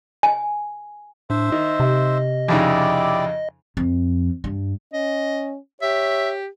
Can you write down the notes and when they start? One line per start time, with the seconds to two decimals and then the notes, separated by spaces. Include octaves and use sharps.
0.23 G#5
1.30 A2 D4 C5 E5
1.52 D#3 D#5
1.80 C3
2.48 F2 C#3 D#4 E4 G4 D5
3.77 F2
4.44 G2
4.93 C#4 D#5
5.82 G4 C#5 E5